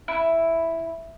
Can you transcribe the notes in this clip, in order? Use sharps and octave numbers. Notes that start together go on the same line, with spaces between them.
E4